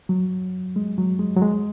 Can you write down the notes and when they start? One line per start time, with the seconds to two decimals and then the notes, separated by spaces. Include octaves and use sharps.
0.09 F#3
0.76 G#3
0.98 F#3
1.19 G#3
1.37 F#3
1.42 G#3